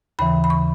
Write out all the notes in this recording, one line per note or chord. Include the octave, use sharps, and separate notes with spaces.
D#2 C#3 E3 B5
B5
C#6